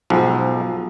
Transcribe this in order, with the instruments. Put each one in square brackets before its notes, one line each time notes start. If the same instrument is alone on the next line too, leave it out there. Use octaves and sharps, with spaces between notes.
[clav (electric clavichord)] B1 G#2 F3